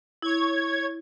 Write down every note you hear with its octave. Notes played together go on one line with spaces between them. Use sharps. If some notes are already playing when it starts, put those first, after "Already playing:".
E4 C#5 G#6